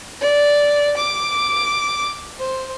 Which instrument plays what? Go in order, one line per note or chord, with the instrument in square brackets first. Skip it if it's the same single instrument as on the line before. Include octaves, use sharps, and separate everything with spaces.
[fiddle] D5
D6
C5